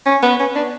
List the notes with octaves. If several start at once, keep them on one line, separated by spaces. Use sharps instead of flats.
C#4
B3
C#4
D4